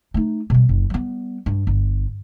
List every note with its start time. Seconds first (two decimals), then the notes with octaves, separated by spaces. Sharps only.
0.14 A3 D#4
0.50 B2 G3
0.69 F#1
0.90 G3 B3
1.46 G2
1.67 G1